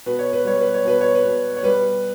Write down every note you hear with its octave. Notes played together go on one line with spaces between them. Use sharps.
B2 B4
C#5
B4
G3 C#5
B4
C#5
B2 B4
C#5
B4
B2
C#5
G3 B4